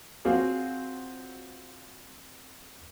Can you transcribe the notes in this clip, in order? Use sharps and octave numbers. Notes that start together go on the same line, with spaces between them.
F#3 C4 F4 F#4 G#4